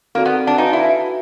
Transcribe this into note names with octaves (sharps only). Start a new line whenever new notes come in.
A#3 C4 D#4 F#4 A4 D5
B3
D4
D#4 F#4 B4 D5 F5 G#5
E4